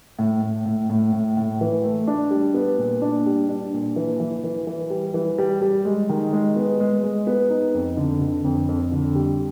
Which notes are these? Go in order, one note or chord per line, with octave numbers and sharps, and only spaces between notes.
A2
A2
A2
A2
A2
A2
E3
A3
D4
G3
B3
A#2
D4
G3
D4
A#2
E3
E3
E3
E3
G3
E3
G3
G3
G#3
D#3
G#3
B3
G#3
G#3
B3
D#4
F2
D3
D3
F2
F2
D3
G3